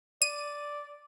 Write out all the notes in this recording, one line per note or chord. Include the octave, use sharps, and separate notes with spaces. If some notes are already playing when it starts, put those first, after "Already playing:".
D5 D#7